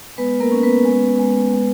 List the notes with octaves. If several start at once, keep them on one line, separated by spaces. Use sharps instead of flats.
G#3 B3 B4
A#3 A#4
C#4
B3 B4
G#3
G#3
G#3